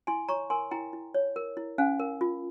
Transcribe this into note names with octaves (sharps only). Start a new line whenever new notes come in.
E4 G#5 C6
C#5 A#5 C#6
A#4 G#5 C6
E4 G5 A#5
E4
C#5
A#4
E4
C#4 F5 G#5
A#4
F4